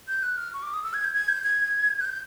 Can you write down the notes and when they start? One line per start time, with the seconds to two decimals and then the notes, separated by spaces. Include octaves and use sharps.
0.08 G6
0.23 F#6
0.37 F6
0.54 C#6
0.63 D6
0.74 D#6
0.84 E6
0.94 G#6
1.04 G6
1.13 G#6
1.29 G6
1.44 G#6
2.01 F#6
2.05 G6